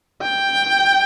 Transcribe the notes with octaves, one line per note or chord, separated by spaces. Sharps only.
G5